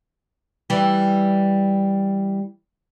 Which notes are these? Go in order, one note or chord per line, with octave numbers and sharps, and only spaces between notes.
E3 G3